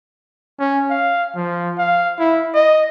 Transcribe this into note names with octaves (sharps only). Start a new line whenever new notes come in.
C#4
F5
F3
F5
E4
D#5